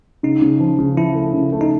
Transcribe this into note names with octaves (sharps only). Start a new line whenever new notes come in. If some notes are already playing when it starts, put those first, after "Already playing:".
C#3 D#4
C#3
F3
C#3
F3 E4
A3
C#3
A3
D#4